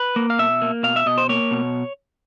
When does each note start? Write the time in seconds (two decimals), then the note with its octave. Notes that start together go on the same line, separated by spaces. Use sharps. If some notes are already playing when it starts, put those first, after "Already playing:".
Already playing: B4
0.16 A#3
0.30 F5
0.39 B2 E5
0.62 A#3
0.83 B2 F5
0.96 E5
1.06 B2 D#5
1.18 C5
1.29 A#3 C#5
1.51 B2